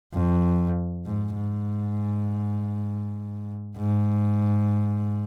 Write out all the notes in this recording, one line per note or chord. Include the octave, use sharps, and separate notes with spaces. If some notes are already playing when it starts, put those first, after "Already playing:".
F2
G#2
G#2
G#2